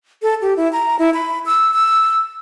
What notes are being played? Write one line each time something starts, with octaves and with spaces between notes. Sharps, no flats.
A4
G4
E4
A#5
E4
B5
E6
E6